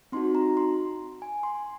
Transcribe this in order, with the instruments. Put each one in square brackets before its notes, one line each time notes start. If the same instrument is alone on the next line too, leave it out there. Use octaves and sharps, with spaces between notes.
[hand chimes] C4 D#4 F#4 C6
A#5
C6
G#5
C6